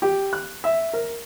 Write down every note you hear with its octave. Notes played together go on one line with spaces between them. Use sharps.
G4
F#6
E5
A#4